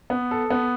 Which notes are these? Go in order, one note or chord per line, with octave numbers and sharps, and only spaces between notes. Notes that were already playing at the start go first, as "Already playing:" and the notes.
B3
A4
B3